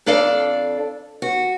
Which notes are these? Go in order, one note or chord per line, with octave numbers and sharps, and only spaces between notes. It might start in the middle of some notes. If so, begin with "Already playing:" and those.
F2 D4 A4 D5 F5
F#4